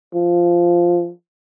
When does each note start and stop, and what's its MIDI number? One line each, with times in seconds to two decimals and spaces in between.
0.14 1.10 53